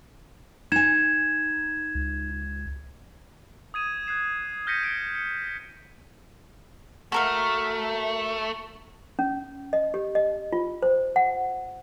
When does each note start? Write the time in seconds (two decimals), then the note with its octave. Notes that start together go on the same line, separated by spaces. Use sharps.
0.72 D#4 G#5 G#6 E7
1.95 C#2
3.74 D#6 G#6 D#7 E7
4.07 F#6 G#6 C7 E7
4.67 F6 G6 A#6 B6 C#7 D#7
4.84 A#6 C#7 D7
5.15 C#7
5.44 A#6
7.12 A3 F#4 A#4 F5
9.19 C#4
9.73 D#5
9.94 G4
10.15 D#5
10.53 F4
10.83 C5
11.16 F#5